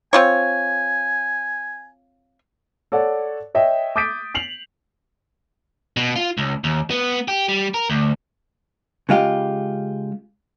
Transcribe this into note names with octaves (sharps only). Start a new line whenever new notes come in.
C4 F4 C#5 G#5
A4 C#5 D5 F#5
C#5 D#5 E5 G5
D6 D#6 G6 A6 B6 D7
C7 F7 F#7
B2
F4
C#2
D#2
B3
G4
G3
A#4
D2
C#3 G#3 F4 G4